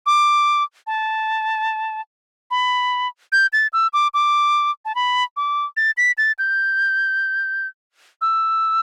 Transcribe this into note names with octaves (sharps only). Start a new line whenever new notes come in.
D6
A5
B5
G6
A6
E6
D6
D6
A5
B5
D6
A6
B6
A6
G6
E6